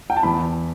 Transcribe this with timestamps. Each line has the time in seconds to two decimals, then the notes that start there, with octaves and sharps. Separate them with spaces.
0.10 G5
0.16 A5
0.23 E2 B5